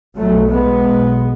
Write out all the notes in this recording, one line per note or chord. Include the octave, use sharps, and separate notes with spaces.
B1 B2 F#3 A3
G#3 B3
B1 B2